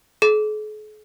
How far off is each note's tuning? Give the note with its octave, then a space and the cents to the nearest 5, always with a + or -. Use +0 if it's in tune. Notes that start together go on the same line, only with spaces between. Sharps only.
G#4 +45